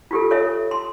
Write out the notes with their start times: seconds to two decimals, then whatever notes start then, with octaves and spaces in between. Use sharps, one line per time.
0.11 F4 G4 A4
0.30 A4 C#5 E5
0.71 C6